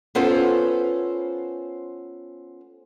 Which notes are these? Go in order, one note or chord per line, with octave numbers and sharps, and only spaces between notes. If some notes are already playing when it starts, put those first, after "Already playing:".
B3 C#4 F4 A4 B4 C5